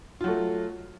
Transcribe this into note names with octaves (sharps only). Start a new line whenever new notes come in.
F#3 A3 F4